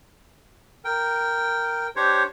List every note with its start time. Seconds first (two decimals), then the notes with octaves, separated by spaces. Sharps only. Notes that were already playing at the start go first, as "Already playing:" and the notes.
0.85 A#4 G5
1.96 D4 G4 C5 C#5